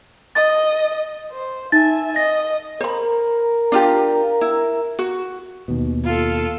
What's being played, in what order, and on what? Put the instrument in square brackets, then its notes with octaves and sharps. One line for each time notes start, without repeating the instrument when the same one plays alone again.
[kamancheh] D#5 [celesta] A6
[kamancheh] C5
[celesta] D#4 A6 [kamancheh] E5 G#5
[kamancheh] D#5 [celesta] A#6
[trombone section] A#4 [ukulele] C5 B5
[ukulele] D4 F4 G4
E4
F#4
[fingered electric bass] D#2 B2
[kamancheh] F4 A4